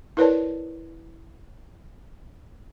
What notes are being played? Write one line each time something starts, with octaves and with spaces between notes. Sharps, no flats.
E4 A#4 B4 C#5 D5 A5